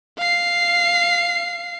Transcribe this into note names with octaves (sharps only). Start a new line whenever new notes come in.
F5 C7